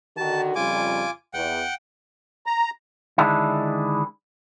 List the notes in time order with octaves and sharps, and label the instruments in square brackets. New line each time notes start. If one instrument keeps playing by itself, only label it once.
[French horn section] D3 D#3 F#4 [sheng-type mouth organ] A5
[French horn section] F2 C#3 G3 [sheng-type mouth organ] F4 G#5 D6
[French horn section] E2 [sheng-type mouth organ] F#5 G5
[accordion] A#5
[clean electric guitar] D3 D#3 G#3 D4 E4